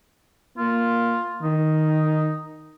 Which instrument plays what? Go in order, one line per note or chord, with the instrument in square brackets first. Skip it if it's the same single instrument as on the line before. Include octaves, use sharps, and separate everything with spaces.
[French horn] A#3 [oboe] F4
[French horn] D#3 [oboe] D#4